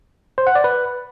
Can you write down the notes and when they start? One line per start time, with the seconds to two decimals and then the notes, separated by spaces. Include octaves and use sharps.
0.38 C5
0.47 F#5
0.55 D5
0.64 B4